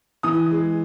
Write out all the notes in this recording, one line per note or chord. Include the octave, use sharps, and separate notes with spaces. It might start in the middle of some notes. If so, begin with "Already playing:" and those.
E3 D#6
G#3